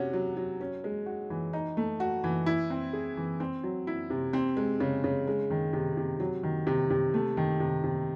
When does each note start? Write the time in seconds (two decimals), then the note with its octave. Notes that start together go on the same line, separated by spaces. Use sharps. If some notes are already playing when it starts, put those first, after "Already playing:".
Already playing: C3 C#4 F#4
0.13 F#3
0.37 F#3
0.61 C#4
0.84 G#3
1.06 F#4
1.30 E3
1.53 D#4
1.77 A3
2.00 F#4
2.24 E3
2.46 E4
2.70 C4
2.93 G#4
3.17 E3
3.40 C4
3.63 F#3
3.87 E4
4.10 C3
4.33 C4
4.57 G#3
4.80 C#3
5.04 C#3
5.27 G#3
5.50 D#3
5.73 C3
5.97 C3
6.20 F#3
6.43 D#3
6.67 C3
6.90 C3
7.14 A3
7.37 D#3
7.60 C3
7.84 C3